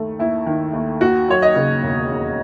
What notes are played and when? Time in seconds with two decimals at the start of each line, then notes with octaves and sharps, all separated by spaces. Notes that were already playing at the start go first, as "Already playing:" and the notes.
Already playing: D#2 D#3 A3
0.19 D#2 E4
0.46 D#3
0.73 D#2
1.01 D#2 F#4
1.28 F#3 C#5
1.42 D#5
1.55 C#3
1.82 E1
2.10 D#2